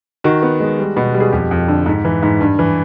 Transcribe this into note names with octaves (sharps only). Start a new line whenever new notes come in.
D#3 F#4
B3
G#3
G3
B2
G3
G#4
F2 G4
F2
D3
G#2
E3
G#2
G2
E3